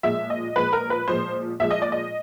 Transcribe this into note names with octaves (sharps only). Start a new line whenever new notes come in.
A#2 F3 G#3 E5
D#5
A#2 F3 G#3 B4
A#4
B4
A#2 F3 G#3 C5
A#2 F3 G#3 E5
D#5
D5
D#5